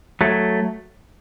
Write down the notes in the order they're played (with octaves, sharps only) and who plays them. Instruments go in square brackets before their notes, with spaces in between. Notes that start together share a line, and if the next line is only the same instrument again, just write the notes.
[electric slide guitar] F#3 A3